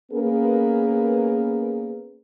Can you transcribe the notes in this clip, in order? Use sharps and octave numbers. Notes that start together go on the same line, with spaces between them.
A#3 B3 C#4 G#4 A#4 B4